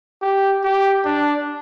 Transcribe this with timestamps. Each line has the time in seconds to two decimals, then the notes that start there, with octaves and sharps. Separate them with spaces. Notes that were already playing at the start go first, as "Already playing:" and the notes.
0.22 G4
0.64 G4
1.05 D4